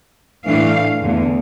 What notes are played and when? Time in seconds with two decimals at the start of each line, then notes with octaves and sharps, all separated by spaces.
0.45 A2 E3 A3 D4 F5
1.02 E2 D3 A3